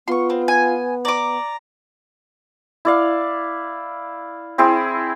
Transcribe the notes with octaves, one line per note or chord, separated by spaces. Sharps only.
B3 F4 C6 C#6
C4
G#5
D5 A#5 D6
E4 D5 F5
C4 E4 G#4